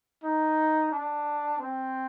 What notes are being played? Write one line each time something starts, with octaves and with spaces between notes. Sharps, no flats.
D#4
D4
C4